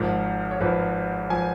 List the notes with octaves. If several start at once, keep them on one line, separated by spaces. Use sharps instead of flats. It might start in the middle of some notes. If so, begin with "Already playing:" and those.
Already playing: G#1 G#2 F3 A#4
C#5
G#1 G#2 F3 B4
F3 G#5